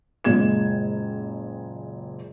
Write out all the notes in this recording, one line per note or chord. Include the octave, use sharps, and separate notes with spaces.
F#1 A#2 G#3 G#6 E7